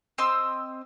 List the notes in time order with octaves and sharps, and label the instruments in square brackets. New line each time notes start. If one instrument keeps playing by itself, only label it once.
[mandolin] C4 D#5 C6 E6